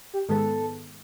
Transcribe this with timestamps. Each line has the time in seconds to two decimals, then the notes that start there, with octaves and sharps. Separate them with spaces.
0.13 G4
0.29 G#2 D#3 G#3 B3 A4